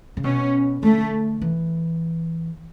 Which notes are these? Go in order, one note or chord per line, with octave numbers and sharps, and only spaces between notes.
C#3
B2 C#4
D3 A3
E3